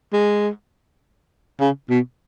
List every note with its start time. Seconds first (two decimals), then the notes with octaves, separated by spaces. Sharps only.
0.13 G#3
1.61 C#3
1.90 B2